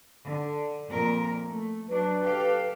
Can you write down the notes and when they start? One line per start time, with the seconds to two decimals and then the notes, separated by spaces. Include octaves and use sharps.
0.25 D3
0.89 F2 A#2 A#4
1.48 A3
1.89 F#3 D4 B4
2.22 G4 A4 F5